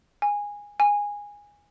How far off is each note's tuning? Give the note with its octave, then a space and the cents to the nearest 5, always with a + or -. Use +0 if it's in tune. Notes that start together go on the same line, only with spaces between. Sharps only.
G#5 -15
G#5 -15